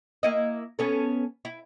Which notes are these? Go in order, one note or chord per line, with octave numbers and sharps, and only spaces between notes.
A#3 E4 D#5
B3 C#4 A4
E4